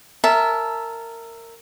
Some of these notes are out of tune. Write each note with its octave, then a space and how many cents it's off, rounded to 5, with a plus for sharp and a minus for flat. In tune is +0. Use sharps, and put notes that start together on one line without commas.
A#4 -20 E5 +0 A5 -20